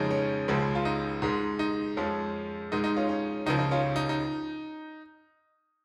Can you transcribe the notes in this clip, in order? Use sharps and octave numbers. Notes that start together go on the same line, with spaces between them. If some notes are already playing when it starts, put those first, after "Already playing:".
Already playing: F2 C#3 F3 G#3 C#4 D#4
C#4
C#2 C#3 F3 G#3
F4
D#4
G#2 G#3
D#4
F2 F3 G#3 C#4
G#2 G#3 D#4
D#4
C#4 F4
C#4
C#2 C#3 F3 D#4
D#4
C#4 F4
D#4
D#4